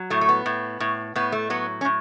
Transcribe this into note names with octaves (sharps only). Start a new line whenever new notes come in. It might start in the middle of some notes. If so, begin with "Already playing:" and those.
Already playing: F#3
A2 A3
A3
B3
A2
A2
A2 B3
A3
F#3 B3
C#4
A2